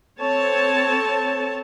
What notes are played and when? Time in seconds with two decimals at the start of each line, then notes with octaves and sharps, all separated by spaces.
0.20 C4 A4 C#5 A5